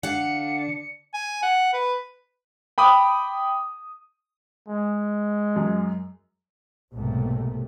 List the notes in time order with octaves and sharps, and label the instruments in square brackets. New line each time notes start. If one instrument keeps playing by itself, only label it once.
[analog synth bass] D3 [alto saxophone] D4 [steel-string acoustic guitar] F5 F#5 [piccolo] C#7
[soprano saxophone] G#5
F#5
B4
[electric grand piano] G5 B5 D6 D#6
[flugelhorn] G#3
[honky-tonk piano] F#2
[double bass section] B1 G#2 C3 A3 A#3